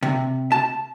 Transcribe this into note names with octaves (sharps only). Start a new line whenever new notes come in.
C3
A5